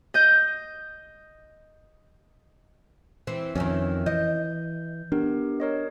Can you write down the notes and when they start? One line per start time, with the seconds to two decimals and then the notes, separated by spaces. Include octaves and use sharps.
0.14 D#5 G6
3.27 E3 C4
3.56 F2 D#3 E3 C#4
4.06 E3 D#5 G6
5.12 B3 D4 G4 A#4
5.60 A#4 C#5 D#5